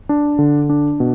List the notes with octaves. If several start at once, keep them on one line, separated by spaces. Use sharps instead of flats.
D4
D3
D4
B2